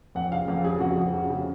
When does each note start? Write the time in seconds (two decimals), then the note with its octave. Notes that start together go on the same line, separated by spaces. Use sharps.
0.15 F2 F#5
0.32 C#3 F5
0.48 F2
0.64 C#3 G#4
0.80 F2 F#4
0.97 F2
1.13 C#3
1.30 C#3